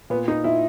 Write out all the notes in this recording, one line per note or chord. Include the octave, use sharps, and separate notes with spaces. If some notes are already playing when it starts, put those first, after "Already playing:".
A#2 B3
D#4
A#2 E4